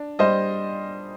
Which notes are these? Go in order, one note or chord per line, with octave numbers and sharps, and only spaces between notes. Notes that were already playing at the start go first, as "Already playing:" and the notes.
Already playing: D4
G3 C5 D#5